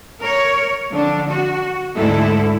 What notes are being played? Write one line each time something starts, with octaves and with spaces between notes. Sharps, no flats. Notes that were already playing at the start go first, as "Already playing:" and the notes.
A#4 C#5
D3 F3 D4
F#4
D2 G#2 D3 G#3 E4 A4